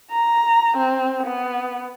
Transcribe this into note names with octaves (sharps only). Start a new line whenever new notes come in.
A#5
C4
B3